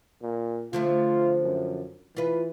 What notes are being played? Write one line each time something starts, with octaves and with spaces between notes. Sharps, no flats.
A#2
D3 F3 A3 F4
F#2
E3 F4 B4